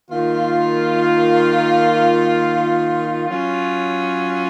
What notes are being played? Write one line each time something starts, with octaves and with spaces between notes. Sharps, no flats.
D#3 A#3 F4
F#3 C#4 F4